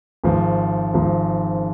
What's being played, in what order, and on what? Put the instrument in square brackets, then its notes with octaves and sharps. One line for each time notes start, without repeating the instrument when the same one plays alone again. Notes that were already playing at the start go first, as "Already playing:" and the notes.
[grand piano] G#1 G#2 F3
G#1 G#2 F3